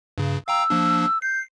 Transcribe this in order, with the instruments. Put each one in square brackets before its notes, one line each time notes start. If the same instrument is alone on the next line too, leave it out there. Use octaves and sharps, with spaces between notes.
[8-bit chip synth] G2 C#3
[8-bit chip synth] F5 G5 A#5 [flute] E6
[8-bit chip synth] F3 A#3 D4
[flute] G6 [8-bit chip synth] C7